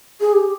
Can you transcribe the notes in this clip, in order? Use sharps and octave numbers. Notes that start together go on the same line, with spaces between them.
G#4
G4